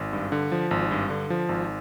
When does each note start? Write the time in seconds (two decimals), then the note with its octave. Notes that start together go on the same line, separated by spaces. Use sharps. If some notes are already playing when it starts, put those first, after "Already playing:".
Already playing: G#1
0.13 G2
0.32 D3
0.52 F3
0.71 G#1
0.91 G2
1.10 D3
1.30 F3
1.49 G#1